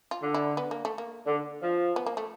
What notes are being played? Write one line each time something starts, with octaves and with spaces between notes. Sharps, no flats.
F4
D3
E4
B3
A#3
A3
A#3
D3
F3
B3
A#3
A3